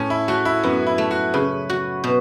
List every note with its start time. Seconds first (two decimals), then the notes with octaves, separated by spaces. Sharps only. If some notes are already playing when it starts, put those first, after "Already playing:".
Already playing: A2 C#4
0.10 E4
0.28 A3 F#4
0.45 E4
0.63 F#2 B3
0.87 E4
0.98 A3
1.11 F#4
1.34 C#3 B4
1.70 F#4
2.04 B2